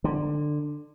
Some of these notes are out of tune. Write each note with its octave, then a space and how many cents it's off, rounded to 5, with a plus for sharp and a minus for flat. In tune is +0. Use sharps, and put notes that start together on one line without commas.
D3 +20